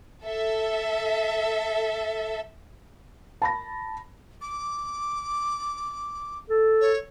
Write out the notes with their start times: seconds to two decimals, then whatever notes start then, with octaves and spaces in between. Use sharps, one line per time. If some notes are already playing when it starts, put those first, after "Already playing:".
0.25 A4 E5
3.42 A5 B5 A#6
4.41 D6
6.50 A4
6.81 C#5